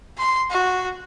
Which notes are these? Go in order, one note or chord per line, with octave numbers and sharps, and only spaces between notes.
C6
F#4